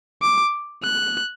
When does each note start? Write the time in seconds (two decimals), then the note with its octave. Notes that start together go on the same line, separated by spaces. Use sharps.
0.22 D6
0.83 F#6